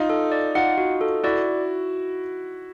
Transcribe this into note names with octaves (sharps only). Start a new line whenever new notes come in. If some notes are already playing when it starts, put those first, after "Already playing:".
Already playing: D#4 F4
A4
D5
D#4 F4 F#5
F#4
A4
E4 F#4 D5